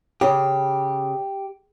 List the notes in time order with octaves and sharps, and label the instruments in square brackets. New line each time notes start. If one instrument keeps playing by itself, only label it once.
[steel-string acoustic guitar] C#3 [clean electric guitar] G4